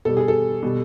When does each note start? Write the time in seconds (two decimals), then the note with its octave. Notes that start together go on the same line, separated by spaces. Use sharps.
0.05 B2 G3 A4
0.17 G#4
0.28 A4
0.63 B2 G3